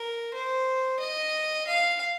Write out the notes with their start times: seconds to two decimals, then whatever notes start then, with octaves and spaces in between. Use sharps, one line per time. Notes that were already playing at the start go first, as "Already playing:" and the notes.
Already playing: A#4
0.34 C5
1.00 D#5
1.67 F5